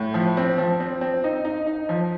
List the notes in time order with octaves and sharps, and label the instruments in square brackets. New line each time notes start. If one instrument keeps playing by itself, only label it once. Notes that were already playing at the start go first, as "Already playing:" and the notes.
Already playing: [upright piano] A2
F3
C4
F3
C4
C4
D#4
D#4
D#4
F3